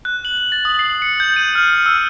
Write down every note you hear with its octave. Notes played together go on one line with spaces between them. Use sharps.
F#6
F#7
F#7
A6
D#6
C7
C#7
G6
D#7
F6
F6
E6